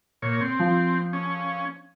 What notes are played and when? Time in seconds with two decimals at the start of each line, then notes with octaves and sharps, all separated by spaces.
0.22 A#2 C#5
0.41 C4
0.59 F3
1.13 C#4